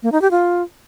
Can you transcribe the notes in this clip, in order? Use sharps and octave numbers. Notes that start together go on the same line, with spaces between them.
A#3
D#4
G4
F4